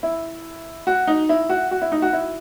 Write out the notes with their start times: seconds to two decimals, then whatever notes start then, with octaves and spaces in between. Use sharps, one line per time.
0.03 E4
0.87 F#4
1.07 D#4
1.29 E4
1.49 F#4
1.71 F#4
1.82 E4
1.92 D#4
2.02 F#4
2.13 E4